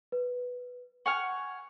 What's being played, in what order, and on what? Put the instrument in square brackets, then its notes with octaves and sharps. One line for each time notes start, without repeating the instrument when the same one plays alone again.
[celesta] B4
[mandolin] F#5 G#5 F6 [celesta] C#6